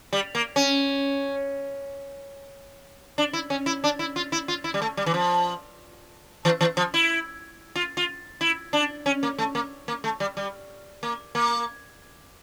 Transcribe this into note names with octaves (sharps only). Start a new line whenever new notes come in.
G3
A#3
C#4
D4
E4
C#4
E4
D4
E4
F4
E4
F4
E4
G3
A3
G3
E3
F3
E3
E3
F3
E4
F4
F4
E4
D4
C#4
A#3
A3
A#3
A#3
A3
G3
G3
A#3
A#3